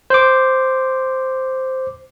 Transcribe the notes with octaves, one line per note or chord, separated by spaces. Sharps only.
C5 D6